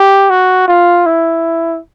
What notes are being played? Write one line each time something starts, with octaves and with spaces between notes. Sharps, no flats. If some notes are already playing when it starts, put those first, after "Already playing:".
Already playing: G4
F#4
F4
E4